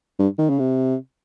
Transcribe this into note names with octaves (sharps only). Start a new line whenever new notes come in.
G2
D#3
C#3
C3